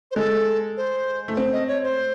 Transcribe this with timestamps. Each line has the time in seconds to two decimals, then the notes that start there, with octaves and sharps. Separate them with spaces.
0.11 C5
0.16 G#3 A4
0.77 C5
1.28 A3
1.37 C4
1.53 D#5
1.68 C#5
1.83 C5